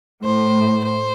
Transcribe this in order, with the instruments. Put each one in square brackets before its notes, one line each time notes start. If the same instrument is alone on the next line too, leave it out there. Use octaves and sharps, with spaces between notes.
[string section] A2 [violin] C5
[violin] C5